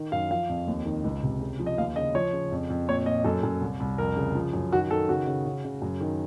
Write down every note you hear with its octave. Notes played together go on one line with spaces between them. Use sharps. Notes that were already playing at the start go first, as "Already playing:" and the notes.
Already playing: D#3
F#2 F5
F3 F5
F2
D#2
D#3
C#2
C3
C#3
F3
D#5
D#2 F5
C#3 D#5
F3 C#5
C#3
F2
F2
A#2 C#5
A#2 D#5
F#2 A4
F#2
C2
C2
F2 A#4
C#3
F3
F#2
D#3 F#4
D#3 A4
C#3 F#4
C#3
C#3
C#3
F#2
D#3